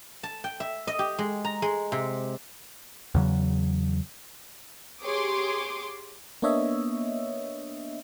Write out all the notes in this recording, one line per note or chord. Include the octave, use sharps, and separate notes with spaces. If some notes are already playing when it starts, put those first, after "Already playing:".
A5
G5
E5
D#5
G4
G#3
A#5
G#3
C3
E2 C#3 F#3
G4 G#4 C#5 C6 D6 D#6
A#3 B3 D4 C#5 D#5 E5